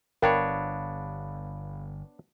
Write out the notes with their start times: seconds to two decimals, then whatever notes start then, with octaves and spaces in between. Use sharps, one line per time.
0.22 G1 B3 D4 A#4 C#5 F5 G5 B5